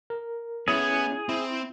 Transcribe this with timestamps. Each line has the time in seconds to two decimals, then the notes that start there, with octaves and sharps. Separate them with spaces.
0.10 A#4
0.68 B3 C#4 E4 G#4
1.29 C4 E4